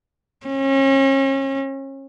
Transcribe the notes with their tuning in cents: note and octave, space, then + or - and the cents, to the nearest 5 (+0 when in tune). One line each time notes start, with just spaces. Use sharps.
C#4 -35